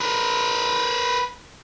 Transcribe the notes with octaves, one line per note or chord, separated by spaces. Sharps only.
A#4 B4